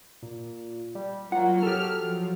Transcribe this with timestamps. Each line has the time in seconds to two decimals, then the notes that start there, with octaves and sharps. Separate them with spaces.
0.22 A#2
0.95 G3
1.32 F#3 A#3 F4 F#5
1.63 F#3 G4 A4 F6
1.99 F3